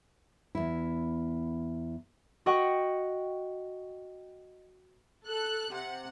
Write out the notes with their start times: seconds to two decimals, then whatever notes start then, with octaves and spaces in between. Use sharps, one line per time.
0.55 E2 E4
2.46 F#4 D#5 F#5 G5 C#6
5.28 A4 F#6
5.73 C3 F#5